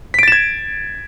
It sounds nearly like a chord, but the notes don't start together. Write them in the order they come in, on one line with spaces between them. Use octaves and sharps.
B6 D7 A6 E7 G#6